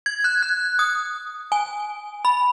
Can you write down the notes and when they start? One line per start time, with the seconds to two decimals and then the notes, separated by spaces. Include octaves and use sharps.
0.06 G#6
0.24 F#6
0.43 F#6
0.79 D#6
1.52 G#5
2.25 B5